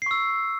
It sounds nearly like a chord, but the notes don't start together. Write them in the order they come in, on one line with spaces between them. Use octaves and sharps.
C7 C#6 E6